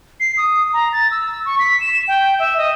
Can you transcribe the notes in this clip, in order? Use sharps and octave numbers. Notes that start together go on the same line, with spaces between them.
C7
D#6
A#5
A6
E6
C#6
B6
E7
G5
E5
D#5